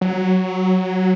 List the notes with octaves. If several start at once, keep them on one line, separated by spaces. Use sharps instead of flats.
F#3